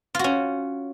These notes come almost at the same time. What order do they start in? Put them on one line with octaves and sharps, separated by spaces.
F4 F#4 C#4